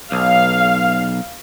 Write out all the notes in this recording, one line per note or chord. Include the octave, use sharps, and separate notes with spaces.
B1 F5